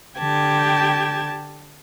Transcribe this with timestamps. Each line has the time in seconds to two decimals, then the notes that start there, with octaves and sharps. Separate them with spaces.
0.18 D3 G4 G5 A5 G#6